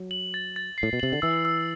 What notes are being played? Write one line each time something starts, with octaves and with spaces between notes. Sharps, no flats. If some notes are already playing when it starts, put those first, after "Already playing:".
Already playing: F#3
F#7
A6
A6
C7
A2
B2
C3 F#7
D3
E3 E6
E6